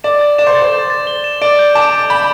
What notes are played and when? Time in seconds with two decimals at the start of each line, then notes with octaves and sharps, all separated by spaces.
0.04 D5 E7
0.21 A6
0.38 D5 E7
0.47 C5
0.55 A6
0.62 C5
0.73 E7
0.90 A6
1.07 G7
1.24 E7
1.42 D5 D7
1.59 G6
1.75 A5 D6
1.92 D6
2.10 B5 G6